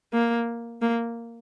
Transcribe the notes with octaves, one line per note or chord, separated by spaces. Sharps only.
A#3
A#3